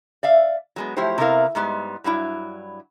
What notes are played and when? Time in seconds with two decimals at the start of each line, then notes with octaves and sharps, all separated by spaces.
0.23 D5 E5 F5
0.76 F#3 G#3 B3
0.97 F3 F#3 A3 E4 G4 C5
1.18 C3 B3 D4 E4 A#4 F5
1.55 G#2 G3 G#3 B3
2.04 G2 F#3 G3 E4